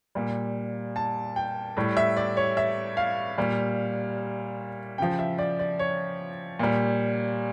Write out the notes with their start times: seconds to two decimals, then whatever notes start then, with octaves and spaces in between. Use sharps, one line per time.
0.15 A#2 G3
0.96 A5
1.36 G5
1.77 A2 G3
1.97 E5
2.17 D5
2.37 C#5
2.57 E5
2.97 F5
3.38 A#2 G3
4.98 C#3 F3 G5
5.19 E5
5.38 D5
5.59 D5
5.79 C#5
6.59 A#2 G3